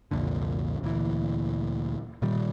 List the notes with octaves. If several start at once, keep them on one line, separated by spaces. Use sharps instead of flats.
C2 F2 A#2 D3
D2 A#2 E3
A#2 D#3 G3